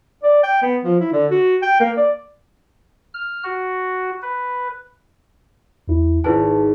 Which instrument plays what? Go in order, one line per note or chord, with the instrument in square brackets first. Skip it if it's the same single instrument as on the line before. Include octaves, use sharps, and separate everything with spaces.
[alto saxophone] D5
G5
B3
F3
E4
D3
F#4
G5
A#3
D5
[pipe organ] F6
F#4
B4
[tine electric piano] E2 E4
[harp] G#1 [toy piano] E4 B4 G#5 [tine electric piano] A5